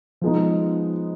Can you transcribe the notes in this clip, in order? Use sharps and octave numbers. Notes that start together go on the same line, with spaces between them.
F3 G#3 B3 D#4